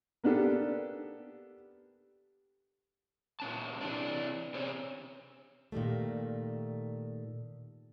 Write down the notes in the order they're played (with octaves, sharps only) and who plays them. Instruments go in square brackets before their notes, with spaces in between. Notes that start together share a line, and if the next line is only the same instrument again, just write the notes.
[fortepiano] A#3 B3 D4 G4 A4
[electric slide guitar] A#2 C#4 A5
C3 E3 C#4 D4 D5
C3 C4 C#4
[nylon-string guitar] A#2 D#3 G3 A3